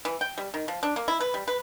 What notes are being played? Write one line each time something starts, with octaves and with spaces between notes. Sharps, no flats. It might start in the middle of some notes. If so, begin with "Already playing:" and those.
E3
G5
G3
D#3
F3
D4
A#3
E4
B4
G3
B4